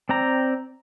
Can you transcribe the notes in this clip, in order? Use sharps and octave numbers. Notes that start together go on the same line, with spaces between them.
C4 D5 G5 A#5